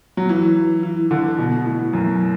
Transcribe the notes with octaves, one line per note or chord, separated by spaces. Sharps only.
F#3
E3
E3
D3
B2
A2
F#2